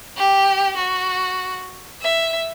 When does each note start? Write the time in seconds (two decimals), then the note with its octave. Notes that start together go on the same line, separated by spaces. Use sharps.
0.17 G4
0.77 F#4
2.01 E5